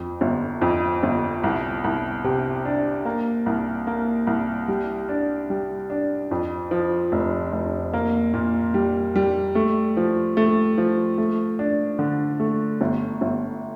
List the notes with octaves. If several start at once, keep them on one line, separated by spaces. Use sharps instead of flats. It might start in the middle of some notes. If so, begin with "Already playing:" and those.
Already playing: F2
G1
F2
G1
C2
C2
C3
D4
A#3
C2
A#3
C2
G3
D4
G3
D4
F2
F3
F1
F1
A#3
A#2
G3
G3
A3
F3
A3
F3
A3
D4
D3
A3
G1
G1